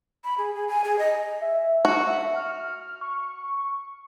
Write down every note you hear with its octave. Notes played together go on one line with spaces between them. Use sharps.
B5
G#4
G#4
G#5
G#4
D#5
E5
F#4 C#7
E5
F6
C#6